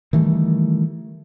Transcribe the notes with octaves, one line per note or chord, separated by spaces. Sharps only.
D#3 E3 G3 A3